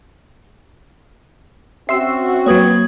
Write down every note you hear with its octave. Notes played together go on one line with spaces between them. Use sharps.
C4 C#4 F#4 E5 C6 E6 C7
F#3 A#3 B4 C#5 D#6 G#6